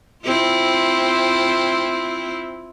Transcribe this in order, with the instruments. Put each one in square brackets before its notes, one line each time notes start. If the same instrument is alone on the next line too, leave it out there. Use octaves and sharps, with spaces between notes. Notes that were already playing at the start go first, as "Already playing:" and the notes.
[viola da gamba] C4 E4 F4